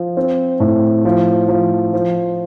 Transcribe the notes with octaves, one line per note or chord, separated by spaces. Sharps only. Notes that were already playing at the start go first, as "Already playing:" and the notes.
Already playing: F3
C4
A2
F3
F3
F3